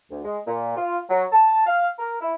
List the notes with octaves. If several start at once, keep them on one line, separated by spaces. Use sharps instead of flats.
D2
G#3
A#2
F4
F#3
A5
F5
A#4
E4